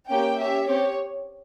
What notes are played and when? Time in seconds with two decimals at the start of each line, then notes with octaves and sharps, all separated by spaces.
0.10 A#3 C#4 G4 G5
0.39 C#4 G4 E5
0.67 C4 G4 C#5